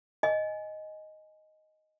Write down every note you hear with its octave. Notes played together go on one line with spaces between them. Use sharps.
D#5 G#5